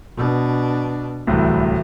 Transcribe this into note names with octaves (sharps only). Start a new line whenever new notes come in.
B2 D4
D1 C2 A2 E3